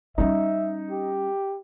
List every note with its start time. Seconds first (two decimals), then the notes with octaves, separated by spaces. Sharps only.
0.18 G3 C#4 D#4 E5
0.91 G4